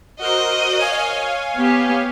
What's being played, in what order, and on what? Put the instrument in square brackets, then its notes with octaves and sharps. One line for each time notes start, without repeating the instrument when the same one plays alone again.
[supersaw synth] F#4 A#4 C5 [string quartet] D#5
[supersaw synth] C#5 F5 G#5
[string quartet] B3 G4